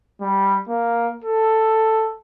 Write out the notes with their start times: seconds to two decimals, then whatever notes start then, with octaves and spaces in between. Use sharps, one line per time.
0.21 G3
0.69 A#3
1.24 A4